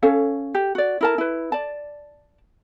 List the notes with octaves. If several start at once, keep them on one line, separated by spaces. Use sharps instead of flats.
C#4 A4 C#5 F5
G4
F#4 D5
E4 A#4 A5
E4 B4
D5 A5